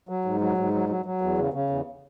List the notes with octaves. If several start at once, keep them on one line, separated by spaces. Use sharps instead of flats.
F#3
G#2
F#3
G#2
F#3
F#3
F#3
E2
C#3
C#3
E2